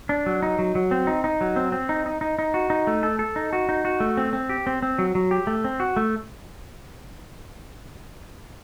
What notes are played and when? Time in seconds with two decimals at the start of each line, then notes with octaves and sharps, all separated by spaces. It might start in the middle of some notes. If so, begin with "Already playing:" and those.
0.09 D4
0.26 F#3
0.43 D#4
0.59 F#3
0.75 F#3
0.91 C4
1.07 D#4
1.24 D#4
1.41 F#3
1.56 C4
1.72 C4
1.89 D#4
2.06 D#4
2.21 D#4
2.39 D#4
2.54 F#4
2.70 D#4
2.87 A3
3.03 A4
3.19 A4
3.36 D#4
3.53 F#4
3.69 D#4
3.85 F#4
4.00 A3
4.17 C4
4.33 C4
4.49 G4
4.67 C4
4.82 C4
4.99 F#3
5.15 F#3
5.31 G4
5.47 A3
5.64 C4
5.80 F#4
5.96 A3